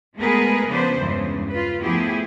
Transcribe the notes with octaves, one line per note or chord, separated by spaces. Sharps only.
G#3 A3 B3 G#4 A#4 B4
C#3 F3 B3 D4 B4 C5
E2 G2 C#3 E3 G#3
F4 B4
F3 A3 B3 E4 G4 G#4